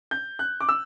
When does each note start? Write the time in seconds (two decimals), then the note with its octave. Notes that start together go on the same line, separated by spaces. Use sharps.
0.11 G6
0.39 F#6
0.61 D6
0.69 E6